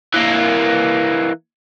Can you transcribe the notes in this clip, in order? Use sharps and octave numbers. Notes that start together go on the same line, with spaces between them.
E3 A#3